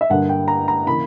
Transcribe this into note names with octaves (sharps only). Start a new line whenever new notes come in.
E5
G2 D3 G3 A#3 F#5
G5
A#5
A#5
C#3 E3 A#3 B5